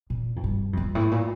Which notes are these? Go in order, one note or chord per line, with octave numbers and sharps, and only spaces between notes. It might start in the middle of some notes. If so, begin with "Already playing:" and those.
A#2
F2
G2
F2
G2
A2
A#2